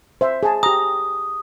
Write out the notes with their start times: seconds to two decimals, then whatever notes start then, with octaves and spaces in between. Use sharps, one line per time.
0.21 C5 E5
0.43 G#4 A5
0.63 G4 A#5 D#6